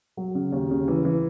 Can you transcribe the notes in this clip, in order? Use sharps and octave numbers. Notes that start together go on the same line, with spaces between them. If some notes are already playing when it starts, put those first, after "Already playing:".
F#3
C#3
D#2
C#3
E3
E3